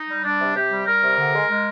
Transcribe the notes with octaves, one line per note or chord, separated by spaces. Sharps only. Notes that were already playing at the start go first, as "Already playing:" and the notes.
Already playing: D#4
G3
G3 D4
C3
C3 G4
G3
G3 A#4
C3
D3
G#3
G#3